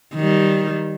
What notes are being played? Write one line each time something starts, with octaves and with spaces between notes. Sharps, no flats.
D#3 G3